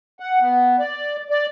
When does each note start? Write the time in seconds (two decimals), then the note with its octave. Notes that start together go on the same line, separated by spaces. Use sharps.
0.20 F#5
0.41 B3
0.79 D5
1.30 D5